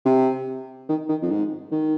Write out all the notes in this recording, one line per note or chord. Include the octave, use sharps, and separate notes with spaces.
C3
D#3
D#3
F2
G#2
D#3